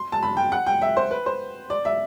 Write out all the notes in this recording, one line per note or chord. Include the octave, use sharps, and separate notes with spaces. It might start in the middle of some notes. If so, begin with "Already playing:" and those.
Already playing: C6
A5
B5
G5
F#5
G5
E5
C5
B4
C5
D5
E5